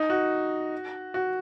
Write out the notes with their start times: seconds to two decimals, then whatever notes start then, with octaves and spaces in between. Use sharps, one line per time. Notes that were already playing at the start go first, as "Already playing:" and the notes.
Already playing: D#4
0.10 F#4
1.14 F#4